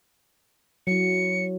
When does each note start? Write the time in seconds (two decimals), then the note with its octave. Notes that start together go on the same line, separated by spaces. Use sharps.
0.87 F#3 E4 C#7